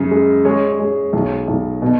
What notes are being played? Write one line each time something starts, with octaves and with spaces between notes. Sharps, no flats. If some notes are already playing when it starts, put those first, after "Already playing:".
Already playing: F#2 C#3
G#3
G#3 C#5
C#5
G#3
C#5
B1 C#5
B1
B2